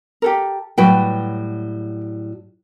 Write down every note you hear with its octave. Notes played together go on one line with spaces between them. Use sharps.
G4 A4 A#4
A2 F#3 G3 F#4 B4 G5